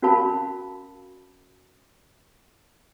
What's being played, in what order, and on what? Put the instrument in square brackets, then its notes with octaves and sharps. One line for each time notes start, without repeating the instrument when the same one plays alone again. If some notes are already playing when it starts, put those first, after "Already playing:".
[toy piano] C#4 F#4 A#4 F5 A5 B5